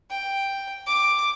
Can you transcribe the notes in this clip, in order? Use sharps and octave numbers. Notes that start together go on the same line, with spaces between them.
G5
D6